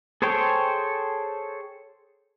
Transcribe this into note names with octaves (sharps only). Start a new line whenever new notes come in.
G#4 A4 C5 C#5 G5